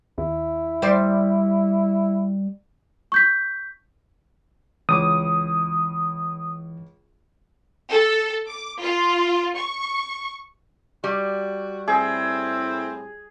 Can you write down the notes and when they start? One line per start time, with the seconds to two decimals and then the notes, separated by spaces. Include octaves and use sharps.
0.18 D#2 E4
0.82 G3 C5 D5
3.12 C#6 G6 B6
4.89 C#2 E3 D6 D#6
7.89 A4
8.47 D6
8.81 F4
9.56 C#6
11.04 G3 F#4
11.88 A2 C4 E4 G#4